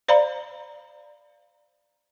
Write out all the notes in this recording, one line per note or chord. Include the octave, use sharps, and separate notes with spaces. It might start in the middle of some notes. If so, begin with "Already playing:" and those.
C5 D5 F5 A#5 B5